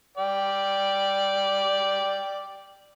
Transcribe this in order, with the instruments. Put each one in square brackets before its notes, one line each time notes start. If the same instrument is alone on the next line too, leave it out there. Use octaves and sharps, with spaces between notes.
[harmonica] D5 G5